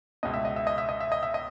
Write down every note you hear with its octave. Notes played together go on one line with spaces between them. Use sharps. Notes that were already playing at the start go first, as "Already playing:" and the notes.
C#2 B2 D#5
E5
D#5
E5
D#5
E5
D#5
E5
D#5
E5
D#5